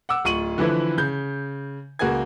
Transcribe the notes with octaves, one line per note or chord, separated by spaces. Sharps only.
F#5 D6 E6
D1 F4 C#6 D#7 F#7
D3 E3 F3 E4 B4
C#3 G6
C#2 A#3 F#4 G#4 G#5 G#6